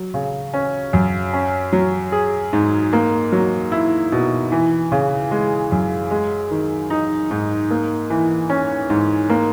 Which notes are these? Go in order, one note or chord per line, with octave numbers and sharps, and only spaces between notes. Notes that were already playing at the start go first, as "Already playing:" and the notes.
Already playing: F#3
C#3
C#4
F#2
C#4
F#3
G#4
G#2
A#3
F#3
E4
B2
E3
C#3
G#3
F#2
G#3
D#3
D#4
G#2
A#3
E3
C#4
G#2
A#3